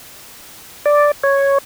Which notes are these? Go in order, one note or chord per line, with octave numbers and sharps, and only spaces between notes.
D5
C#5